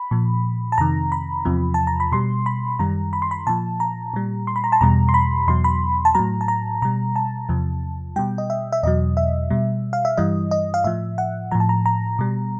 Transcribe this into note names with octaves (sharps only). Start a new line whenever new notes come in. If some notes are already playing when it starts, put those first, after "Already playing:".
Already playing: B5
A#2 F3
A5
F2 C3 D#3 A#5
B5
E2 C3 F3
A5
A#5
B5
B2 G3 C6
B5
F#2 D#3 G3 A#5
B5
C6
B5
A#2 F3 A5
A#5
A#2 G3
C6
B5
A#5
A5
E2 B2 G3 A#5
C6
B5
E2 B2 F#3 C6
B5
A5
A2 F#3 A#5
A5
A#5
B2 G3 A#5
A5
E2 C3 F3
B2 G3 G5
D#5
E5
E5
E2 B2 F#3 D#5
E5
B2 G3
F5
E5
G2 E3 G3 D#5
D#5
F5
A2 F3 E5
F#5
A2 F3 A#5
A5
A#5
A#5
B2 G3